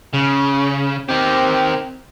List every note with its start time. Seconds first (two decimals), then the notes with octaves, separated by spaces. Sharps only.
0.14 C#3
1.09 D#3 C4 G4